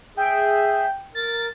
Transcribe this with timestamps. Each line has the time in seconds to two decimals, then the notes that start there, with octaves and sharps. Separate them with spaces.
0.17 G#4 E5 G5
1.15 A#4 A6